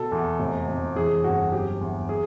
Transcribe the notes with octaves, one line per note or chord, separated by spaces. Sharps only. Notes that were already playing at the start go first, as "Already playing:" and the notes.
Already playing: B2 A4
E2
F1
F1
E3 G#4
G1 F#4
F#3 G4
E2
G#4